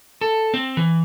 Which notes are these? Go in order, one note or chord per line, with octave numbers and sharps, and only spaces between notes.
A4
C4
E3